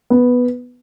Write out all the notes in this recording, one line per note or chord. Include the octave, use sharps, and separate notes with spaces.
B3